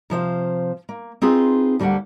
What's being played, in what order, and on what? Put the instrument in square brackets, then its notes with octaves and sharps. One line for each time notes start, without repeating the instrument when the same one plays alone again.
[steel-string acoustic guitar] C3 F3 C5 F5
A#3
C4 D#4 F4 G#4 B4
D2 G3 A#3 D4 F#5